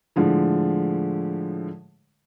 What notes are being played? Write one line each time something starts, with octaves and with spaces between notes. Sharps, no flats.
A2 D3 F3 G#3